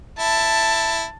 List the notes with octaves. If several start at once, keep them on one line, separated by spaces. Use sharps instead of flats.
E4 A5